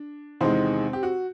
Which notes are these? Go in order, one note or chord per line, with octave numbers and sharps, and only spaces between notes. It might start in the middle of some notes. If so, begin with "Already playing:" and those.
Already playing: D4
E2 C3 D#3 G#3 C4 C5
G4
F#4